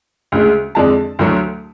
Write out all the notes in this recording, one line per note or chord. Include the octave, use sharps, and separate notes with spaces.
D2 C#3 G#3
F2 D3 G#3 D4 A5
D2 D3 F#3 A3